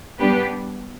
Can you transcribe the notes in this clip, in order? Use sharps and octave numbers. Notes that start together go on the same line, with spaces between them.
G3 B3 D4 G4 B4